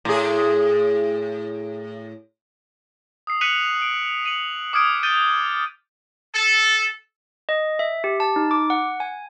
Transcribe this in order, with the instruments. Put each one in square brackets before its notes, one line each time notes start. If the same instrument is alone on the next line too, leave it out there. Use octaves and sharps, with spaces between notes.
[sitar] A2 G#4
[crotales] D#6 E6 C7
F#6 B6 C#7 D#7 F7 F#7
D7
C#7 D#7 F7 F#7
D6 D#6 F6 G#6 D7 F#7
G6 A6 D7 D#7 G7
[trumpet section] A4
[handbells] D#5
E5
G4
A5
D#4
D6
F#5
G#5